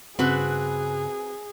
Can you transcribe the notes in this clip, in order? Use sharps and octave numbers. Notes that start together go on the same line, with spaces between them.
G2 C#3 C4 F#4 G#4 B4